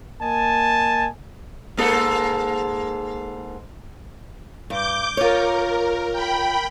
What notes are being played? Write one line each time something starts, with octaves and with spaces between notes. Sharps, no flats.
A#3 D#5 G#5 A5
G#2 A#3 A4
G2 D6 G6
F4 A#4 C#5
G5 B5